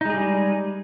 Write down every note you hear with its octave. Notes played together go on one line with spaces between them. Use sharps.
G3 G#3 D#4 G#4